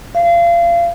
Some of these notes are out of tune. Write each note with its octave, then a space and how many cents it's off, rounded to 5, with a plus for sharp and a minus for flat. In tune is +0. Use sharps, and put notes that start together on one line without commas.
F5 -30